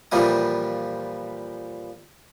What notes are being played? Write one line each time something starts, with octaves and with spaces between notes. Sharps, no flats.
A#2 E3 F3 G3 E4 D#6